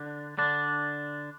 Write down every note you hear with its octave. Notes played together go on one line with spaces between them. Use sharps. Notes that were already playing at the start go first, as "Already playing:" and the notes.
Already playing: D3 D4
D3 D4